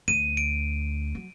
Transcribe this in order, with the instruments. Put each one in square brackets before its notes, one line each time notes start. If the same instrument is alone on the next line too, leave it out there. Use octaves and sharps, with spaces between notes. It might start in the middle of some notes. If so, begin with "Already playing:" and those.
[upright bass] D2 [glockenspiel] D#7
[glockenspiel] D7
[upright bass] F#3